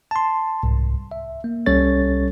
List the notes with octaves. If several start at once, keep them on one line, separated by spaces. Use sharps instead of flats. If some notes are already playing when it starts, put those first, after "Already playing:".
A5 C6
C2 G#2
E5
A#3
C2 G3 C#4 A4 C#5 A6